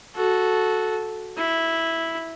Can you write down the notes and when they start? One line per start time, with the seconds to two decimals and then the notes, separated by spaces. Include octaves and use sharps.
0.15 F#4 A4
1.38 E4